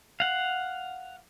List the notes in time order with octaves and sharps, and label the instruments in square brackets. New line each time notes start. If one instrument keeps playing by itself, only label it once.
[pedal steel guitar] F5 F#5